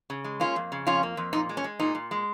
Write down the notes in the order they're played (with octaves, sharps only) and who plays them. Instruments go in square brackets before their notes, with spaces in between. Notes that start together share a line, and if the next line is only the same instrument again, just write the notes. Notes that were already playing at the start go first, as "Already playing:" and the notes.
[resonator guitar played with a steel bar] C#3
G#3
A#3 C#4 F4
F2
C#3
F2 C#4 F4
A#3
F2
A#2 D#4
G#3
C#4
G#3
A#2 D#4
A#2
G#3